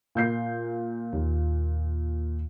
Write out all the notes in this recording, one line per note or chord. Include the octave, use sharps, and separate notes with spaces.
A#2 G6 C7
D#2